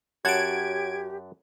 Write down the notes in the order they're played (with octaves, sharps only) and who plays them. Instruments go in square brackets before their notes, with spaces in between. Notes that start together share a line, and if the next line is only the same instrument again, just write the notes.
[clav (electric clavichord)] F#2 F#5 A5 [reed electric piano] F#4 C#5 [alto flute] G4 [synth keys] G#6 D7